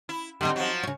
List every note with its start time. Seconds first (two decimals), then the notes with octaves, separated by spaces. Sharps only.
0.09 E4
0.41 D3 C4 D#4 G4
0.56 F3 F#3
0.83 C#3 C#5